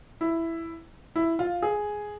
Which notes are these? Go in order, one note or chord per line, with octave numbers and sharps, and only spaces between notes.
E4
E4
F4
G#4